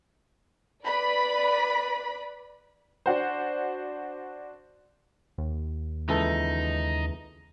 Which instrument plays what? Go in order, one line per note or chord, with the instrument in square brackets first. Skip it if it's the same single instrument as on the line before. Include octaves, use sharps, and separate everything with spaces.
[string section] B4 D5 B5
[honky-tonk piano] D4 F#4 C5
[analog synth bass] D#2
[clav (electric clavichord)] C#2 E3 A4 [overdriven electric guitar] D#4